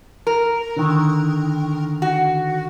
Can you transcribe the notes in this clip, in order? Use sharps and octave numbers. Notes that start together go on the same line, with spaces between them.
A#4
D3 D#3
F#4